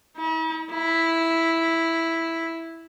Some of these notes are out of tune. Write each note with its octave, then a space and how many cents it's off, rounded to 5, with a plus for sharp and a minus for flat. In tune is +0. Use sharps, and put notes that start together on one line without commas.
E4 -45
E4 -5